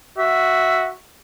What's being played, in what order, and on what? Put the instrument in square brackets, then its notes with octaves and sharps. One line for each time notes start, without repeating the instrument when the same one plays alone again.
[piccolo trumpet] F#4 [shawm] E5